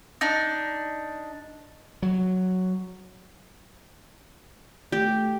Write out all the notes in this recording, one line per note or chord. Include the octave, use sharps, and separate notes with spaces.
D4 D#4
F#3
A3 G4